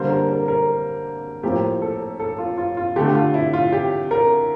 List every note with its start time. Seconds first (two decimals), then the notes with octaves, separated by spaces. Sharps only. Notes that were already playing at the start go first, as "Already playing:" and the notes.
Already playing: D3 G3 A#3 C5
0.10 A#4
0.29 A#4
0.48 A#4
1.43 A2 F3 A#3 G4
1.82 A4
2.20 A4
2.38 F4
2.58 F4
2.77 F4
2.96 D3 A3 G4
3.15 F4
3.34 E4
3.53 F4
3.72 G4
4.11 A#4